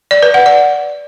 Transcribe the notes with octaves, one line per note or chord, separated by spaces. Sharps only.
D5
B4
F#5
D5